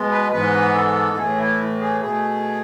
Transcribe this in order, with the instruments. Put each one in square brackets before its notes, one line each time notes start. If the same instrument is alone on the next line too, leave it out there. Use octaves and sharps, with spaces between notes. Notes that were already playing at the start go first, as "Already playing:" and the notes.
Already playing: [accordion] B2 G#3 B3
B4
G#2 E3 G#3 B3 B4
A4
A2 E3 A3 G#4
E4
G#4
B2 A3 G#4